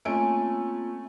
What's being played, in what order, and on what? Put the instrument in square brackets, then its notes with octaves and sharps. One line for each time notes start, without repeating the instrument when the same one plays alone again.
[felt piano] A3 C#4 D7 [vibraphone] A#3 C4 F4 [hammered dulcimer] G#5